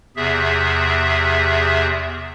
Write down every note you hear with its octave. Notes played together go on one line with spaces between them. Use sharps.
E2 C3 G#4 E5